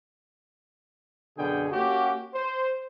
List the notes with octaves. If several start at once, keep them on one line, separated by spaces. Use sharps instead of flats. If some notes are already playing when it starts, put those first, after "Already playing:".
F#2 B2 D3 G#4 G5
A#3 C#4 F#4 G4
C5